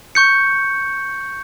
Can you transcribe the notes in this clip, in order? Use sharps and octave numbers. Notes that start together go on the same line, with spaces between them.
C#6 G6 C#7